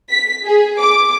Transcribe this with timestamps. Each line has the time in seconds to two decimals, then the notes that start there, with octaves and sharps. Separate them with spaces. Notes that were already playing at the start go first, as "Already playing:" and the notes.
0.10 B6
0.45 G#4
0.80 D6